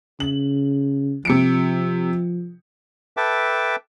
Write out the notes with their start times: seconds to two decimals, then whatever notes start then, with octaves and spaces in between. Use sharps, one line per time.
0.20 C#3 F#7
1.25 C3 F3 C#7 D7
3.17 A4 B4 E5 G5 A5 D6